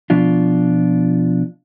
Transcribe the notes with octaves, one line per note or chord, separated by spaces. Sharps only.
B2 F3 D4 F4